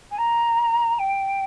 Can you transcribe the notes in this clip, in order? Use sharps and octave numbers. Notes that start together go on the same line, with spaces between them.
G#5
A#5
G5